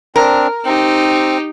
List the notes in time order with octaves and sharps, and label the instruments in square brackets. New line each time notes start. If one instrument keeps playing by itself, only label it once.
[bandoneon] C4 D4 [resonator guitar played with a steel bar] A#4
[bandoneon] C4 [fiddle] D#4 G4